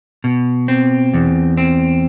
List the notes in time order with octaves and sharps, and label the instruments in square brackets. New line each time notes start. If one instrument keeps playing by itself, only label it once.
[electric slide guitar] B2
C4
E2
C4